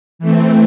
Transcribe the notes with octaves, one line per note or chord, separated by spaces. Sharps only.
E3 A3 C4